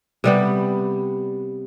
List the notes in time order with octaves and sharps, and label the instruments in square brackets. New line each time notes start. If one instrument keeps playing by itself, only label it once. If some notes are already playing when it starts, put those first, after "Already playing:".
[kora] C3 G3 B3